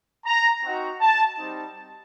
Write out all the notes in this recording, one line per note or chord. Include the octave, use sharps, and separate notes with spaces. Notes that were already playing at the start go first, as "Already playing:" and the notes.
A#5
C4 D#4 F#4
A5
G3 C4 D#4